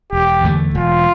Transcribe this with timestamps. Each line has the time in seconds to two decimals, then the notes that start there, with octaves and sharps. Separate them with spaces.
0.13 E1 G4
0.44 E2 D3 A3
0.75 E1 F4